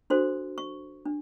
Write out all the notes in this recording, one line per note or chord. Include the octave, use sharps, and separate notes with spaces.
D4 F#4 A4 C5 C6
C#6
D4